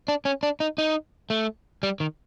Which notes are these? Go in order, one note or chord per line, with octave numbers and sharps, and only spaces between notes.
D4
C#4
D4
D#4
D#4
A3
G3
D#3